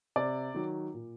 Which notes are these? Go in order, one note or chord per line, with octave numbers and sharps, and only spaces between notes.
C3 D5
D#3 F#3
A#2